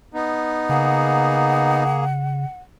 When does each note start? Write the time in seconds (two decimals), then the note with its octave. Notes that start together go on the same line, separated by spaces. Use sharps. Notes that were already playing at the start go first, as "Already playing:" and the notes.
0.14 B3 D#4
0.69 C#3 A#3 G#4 F#5